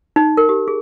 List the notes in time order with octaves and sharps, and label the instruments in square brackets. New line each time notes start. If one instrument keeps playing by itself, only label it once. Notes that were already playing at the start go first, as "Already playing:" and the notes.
[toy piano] D#4
A#4
G4
G#4